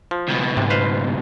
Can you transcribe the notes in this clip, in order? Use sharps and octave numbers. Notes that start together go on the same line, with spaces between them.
F3
C#2 B2
G#2 C3
B4 C5 F5